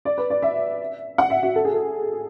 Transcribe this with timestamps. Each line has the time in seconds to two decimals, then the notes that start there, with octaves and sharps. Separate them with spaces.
0.05 D5
0.18 B4
0.30 D5
0.42 E5
1.18 F#5
1.30 E5
1.43 F#4
1.56 A4
1.65 G#4
1.74 A4